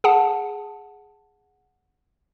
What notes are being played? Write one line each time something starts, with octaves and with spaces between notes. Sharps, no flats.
G#4 F#5 A5